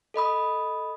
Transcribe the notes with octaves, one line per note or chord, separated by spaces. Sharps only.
A4 D#5 B5 D#6